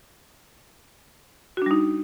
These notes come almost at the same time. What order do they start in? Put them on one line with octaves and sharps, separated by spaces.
F#4 D4 G3 D#4